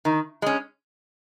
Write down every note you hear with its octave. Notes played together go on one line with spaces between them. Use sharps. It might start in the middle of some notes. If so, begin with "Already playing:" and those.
D#3
G#3 C#4